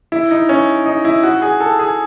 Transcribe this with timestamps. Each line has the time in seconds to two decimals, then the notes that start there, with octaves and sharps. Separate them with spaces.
0.12 E4
0.31 D#4
0.49 C#4
0.86 D#4
1.05 E4
1.23 F#4
1.42 G#4
1.60 A4
1.79 G#4